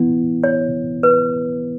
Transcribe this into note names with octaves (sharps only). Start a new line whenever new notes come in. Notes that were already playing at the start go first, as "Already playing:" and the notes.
Already playing: E3 B3 E4
C#5
B4